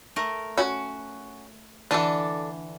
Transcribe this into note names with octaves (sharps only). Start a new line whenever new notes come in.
A3 A#4
C#4 F#4
D3 E3 D4 A4 A5